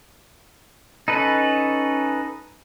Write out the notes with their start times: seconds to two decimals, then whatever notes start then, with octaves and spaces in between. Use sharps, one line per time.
1.08 C#4 D#4 A4 B4